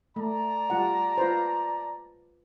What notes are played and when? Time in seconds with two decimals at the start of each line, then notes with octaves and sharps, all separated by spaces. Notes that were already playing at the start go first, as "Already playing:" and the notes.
0.16 A3 D5 A5 A#5
0.70 G3 F4 F#5
1.18 F4 B4 C5